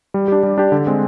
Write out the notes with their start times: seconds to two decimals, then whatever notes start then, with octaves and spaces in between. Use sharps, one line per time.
0.14 G3
0.28 D4 G4
0.43 G3
0.58 D4 G4
0.72 D3
0.87 G#3 C4